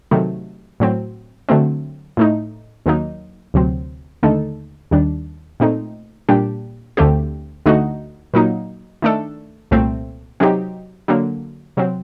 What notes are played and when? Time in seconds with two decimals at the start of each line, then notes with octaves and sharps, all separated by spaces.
0.11 C3 D#3 F#3 A3
0.80 A2 F#3 C4
1.49 D3 F#3 A3 C4
2.17 A2 A3 D#4
2.86 D#2 D#3 F#3 A#3 D#4
3.54 D2 C3 F#3 C4
4.23 D#2 D3 A3 D#4 A4
4.91 D#2 D#3 G3 D4
5.60 A#2 A3 C4 D#4
6.29 A#2 G3 D4 G4
6.97 D2 D3 A3 C4 G4
7.66 D2 D3 A3 D#4 F#4
8.34 A#2 F#3 A#3 D#4
9.02 D#3 A3 D4 A4
9.71 C2 A#2 A3 C4
10.40 C3 F#3 C4 D#4 G4
11.08 D3 F#3 A#3
11.77 C3 F#3 C4